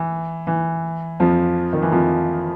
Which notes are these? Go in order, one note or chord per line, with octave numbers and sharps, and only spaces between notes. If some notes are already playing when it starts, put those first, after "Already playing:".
Already playing: E3
E3
F2 F3
D#3
E3
F2 F3